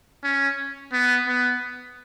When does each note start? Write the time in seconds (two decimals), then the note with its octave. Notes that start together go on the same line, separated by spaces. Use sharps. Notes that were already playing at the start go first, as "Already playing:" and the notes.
0.24 C#4
0.93 B3
1.27 B3